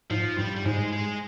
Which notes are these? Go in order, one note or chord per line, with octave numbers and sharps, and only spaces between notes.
G#2 F3
G2 G3
G3
G#2 G#3
G#3